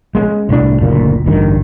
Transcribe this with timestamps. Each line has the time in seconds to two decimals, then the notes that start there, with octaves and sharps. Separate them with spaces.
0.15 G#3 A#3 C#4
0.49 C2 A2 D4
0.81 F#1 D2 A#2
1.26 A1 D2 G2 D#3